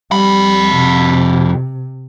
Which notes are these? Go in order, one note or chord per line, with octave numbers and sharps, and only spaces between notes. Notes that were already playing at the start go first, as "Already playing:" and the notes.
F2 G3 B5
C3